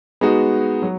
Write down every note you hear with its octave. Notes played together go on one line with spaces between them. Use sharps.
G#3 B3 D#4 F#4
F#3